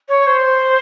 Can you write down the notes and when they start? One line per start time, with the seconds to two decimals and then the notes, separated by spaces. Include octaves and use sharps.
0.08 C#5
0.27 C5